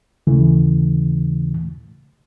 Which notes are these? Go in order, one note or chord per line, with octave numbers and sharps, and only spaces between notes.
D#2 C#3 E3 A3